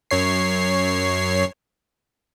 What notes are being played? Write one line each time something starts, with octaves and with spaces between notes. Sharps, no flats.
F#2 C#5 C7